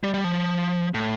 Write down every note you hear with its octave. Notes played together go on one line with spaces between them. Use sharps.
G3
G3
F3
A2